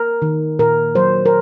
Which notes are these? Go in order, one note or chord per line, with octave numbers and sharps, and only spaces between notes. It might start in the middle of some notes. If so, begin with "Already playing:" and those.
Already playing: A#4
D#3
A#2 A#4
F#3 C5
A#4